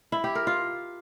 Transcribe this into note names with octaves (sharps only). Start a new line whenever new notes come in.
E4
G4
A#4
F4